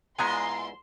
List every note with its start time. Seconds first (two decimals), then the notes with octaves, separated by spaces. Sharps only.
0.19 A#2 G#3 B3 E4 G#5 A#5 C6